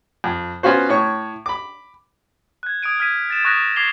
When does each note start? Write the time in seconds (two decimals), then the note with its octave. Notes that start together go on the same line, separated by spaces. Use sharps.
0.24 F2
0.63 B3 C#4 F4 F#4 C5
0.89 A2 C#5 C#6
1.46 B5 D6
2.63 F#6 G#6
2.83 D#6 G#6 D7 D#7
3.00 F6 G#6 B6 D#7
3.30 A6 E7
3.45 C#6 D#6 F#6 G#6 A#6
3.76 D6 G#6 C7 E7 F7 G7